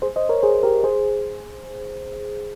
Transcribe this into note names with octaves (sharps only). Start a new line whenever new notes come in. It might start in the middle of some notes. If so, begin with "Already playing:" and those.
G#4 C5
C5 D#5
A#4 C#5
G#4 C5
G4 A#4
G#4 C5